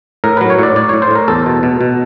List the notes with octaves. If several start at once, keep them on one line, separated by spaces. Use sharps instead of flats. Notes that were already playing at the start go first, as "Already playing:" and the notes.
A2 A#4
F#3 B4
C#5
A2 D5
A2 D5
A2 C#5
C5
A2 A#4
E2 A4
B2
B2
B2